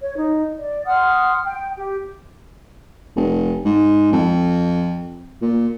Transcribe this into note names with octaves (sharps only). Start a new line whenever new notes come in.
C#5
D#4
D5
F#5 C6 D#6 F6
G5
G4
F1
G#2
F2
A#2